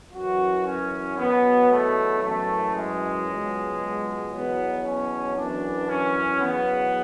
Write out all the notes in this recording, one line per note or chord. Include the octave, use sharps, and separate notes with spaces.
F#2 E3 F#4
C#4
E2 B2 F#3 B3
A3
F#2 E3 A3
G#3
C#2 B2 F#3
E2 B2 F#3 B3
C#4
F#2 E3 D4
C#4
E2 C#3 F#3 B3